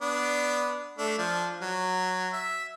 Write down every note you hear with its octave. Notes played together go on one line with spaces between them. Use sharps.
B3 D4
A3 D4
F3 D4
F#3
E5